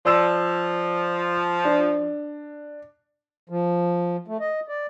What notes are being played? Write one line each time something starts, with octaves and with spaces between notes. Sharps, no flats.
F3 D5 E6 E7
D4
F3
A3
D#5
D5